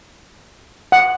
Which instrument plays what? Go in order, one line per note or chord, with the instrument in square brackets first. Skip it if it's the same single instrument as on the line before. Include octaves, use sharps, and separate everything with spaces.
[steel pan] F#5